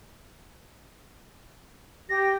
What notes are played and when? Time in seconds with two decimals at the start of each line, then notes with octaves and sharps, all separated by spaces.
2.09 G4 A#6